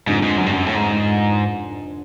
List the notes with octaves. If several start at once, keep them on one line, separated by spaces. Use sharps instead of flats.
F1 F2 G#2 D3
G#2
F#2
G2
F#2
A2
G#2